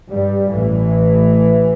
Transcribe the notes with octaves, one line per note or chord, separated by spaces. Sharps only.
G2 G3
A1 A2 E3